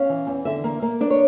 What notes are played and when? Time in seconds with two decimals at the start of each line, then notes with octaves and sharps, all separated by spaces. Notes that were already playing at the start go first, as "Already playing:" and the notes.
Already playing: C#4 F5
0.09 E3
0.27 E2
0.45 D3 E5
0.64 A#3
0.82 A#3
1.01 D4 D5
1.10 C#5